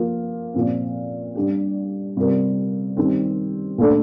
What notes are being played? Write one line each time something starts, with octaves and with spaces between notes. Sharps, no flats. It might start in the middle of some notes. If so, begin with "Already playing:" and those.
Already playing: F3 A#3 F4
A#2 F3 C4
G3 D4 G4
C3 G3 C4 F4 A#4
D#3 G3 C4 G4
A#2 A3 D4 A4